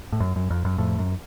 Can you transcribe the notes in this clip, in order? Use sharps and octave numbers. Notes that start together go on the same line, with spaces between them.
A2
F#2
F#2
F2
F#2
F2 A2
F#2